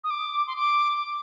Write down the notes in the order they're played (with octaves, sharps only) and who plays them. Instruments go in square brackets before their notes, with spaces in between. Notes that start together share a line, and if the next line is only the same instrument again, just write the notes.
[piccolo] D#6
D6
C6
D6
D6